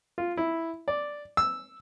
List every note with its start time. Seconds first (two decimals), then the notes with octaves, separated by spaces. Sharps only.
0.18 F4
0.37 E4
0.88 D5
1.37 E6